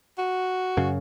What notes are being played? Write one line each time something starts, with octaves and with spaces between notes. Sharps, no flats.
F#4
F#2 C#3